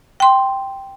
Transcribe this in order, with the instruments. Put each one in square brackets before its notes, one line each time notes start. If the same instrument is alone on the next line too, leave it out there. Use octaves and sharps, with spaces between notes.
[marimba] G5 C6